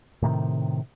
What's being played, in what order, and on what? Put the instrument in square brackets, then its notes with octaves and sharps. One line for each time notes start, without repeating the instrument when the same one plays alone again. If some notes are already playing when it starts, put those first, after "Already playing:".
[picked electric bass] A2 C3 D#3